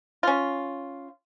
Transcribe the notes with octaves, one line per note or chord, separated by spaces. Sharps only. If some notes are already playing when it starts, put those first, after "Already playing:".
C#4 F4